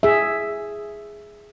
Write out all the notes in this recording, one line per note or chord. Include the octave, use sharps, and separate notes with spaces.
G#4 E5